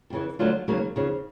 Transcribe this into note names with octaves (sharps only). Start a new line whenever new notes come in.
F2 C#3 E3
D3 F#3 A3 D4 F4
D#2 C#3 F#3 A#3
D#2 C#3 F3